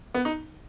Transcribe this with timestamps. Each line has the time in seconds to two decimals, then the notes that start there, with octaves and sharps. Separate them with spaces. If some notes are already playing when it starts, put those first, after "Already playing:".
0.14 B3
0.25 D#4